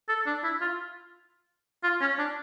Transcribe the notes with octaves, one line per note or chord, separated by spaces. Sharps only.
A4
D4
E4
F4
F4
C#4
D4